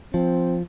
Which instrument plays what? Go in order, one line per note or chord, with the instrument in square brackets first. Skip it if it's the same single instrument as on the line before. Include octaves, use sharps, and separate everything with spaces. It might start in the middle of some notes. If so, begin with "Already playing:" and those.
[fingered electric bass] F3 [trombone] C4